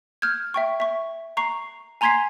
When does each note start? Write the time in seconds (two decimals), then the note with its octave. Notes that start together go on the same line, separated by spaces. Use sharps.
0.22 F6 G6 G#6
0.54 E5 G5 C#6
0.80 E5 C#6
1.37 A#5 C#6 C7
2.01 G#5 A#5 C6 G#6 B6 C7